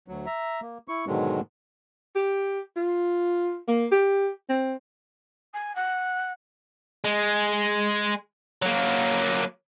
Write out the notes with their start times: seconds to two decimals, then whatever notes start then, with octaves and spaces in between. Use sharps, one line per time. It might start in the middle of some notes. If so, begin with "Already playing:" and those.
0.08 D2 F#3
0.26 E5 A#5
0.62 A#3
0.88 E4 C#6
1.07 G#2 B2 D3 D#3 F#3 G#3
2.16 G4
2.76 F4
3.68 A#3
3.92 G4
4.49 C4
5.53 G#5
5.75 F#5
7.04 G#3
8.62 F#3 A#3